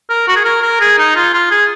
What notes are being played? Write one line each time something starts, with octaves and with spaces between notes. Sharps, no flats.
A#4
F#4
G#4
A#4
A#4
G#4
D#4
F4
F4
G#4